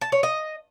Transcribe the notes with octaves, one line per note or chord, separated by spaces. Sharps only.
A5
C#5
D#5